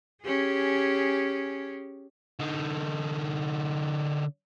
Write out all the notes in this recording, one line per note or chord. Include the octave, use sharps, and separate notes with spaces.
C#4 G4 G#4
D3 D#4